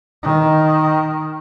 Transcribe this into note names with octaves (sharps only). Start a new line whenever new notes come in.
D#3